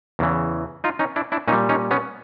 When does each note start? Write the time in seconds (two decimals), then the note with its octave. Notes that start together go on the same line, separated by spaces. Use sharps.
0.19 E2 C#3 E3
0.84 D#4 F4
0.99 C#4 D#4
1.16 D4 E4
1.32 D4 E4
1.48 A#2 C#4 D#4
1.52 G3
1.69 C#4 D#4
1.91 B3 C#4